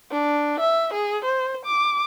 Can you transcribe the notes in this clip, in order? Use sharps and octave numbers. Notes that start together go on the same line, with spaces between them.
D4
E5
G#4
C5
D6